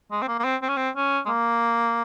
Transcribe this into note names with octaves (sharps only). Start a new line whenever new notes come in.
G#3
C4
A#3
A#3
C4
C4
C#4
C4
C#4
G#3
A#3